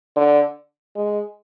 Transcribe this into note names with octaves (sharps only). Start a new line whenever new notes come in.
D3
G#3